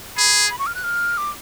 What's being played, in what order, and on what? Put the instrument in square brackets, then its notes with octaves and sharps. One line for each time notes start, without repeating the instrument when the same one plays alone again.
[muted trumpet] G#4 [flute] B5
[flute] B5
C#6
F6
F#6
F6
D6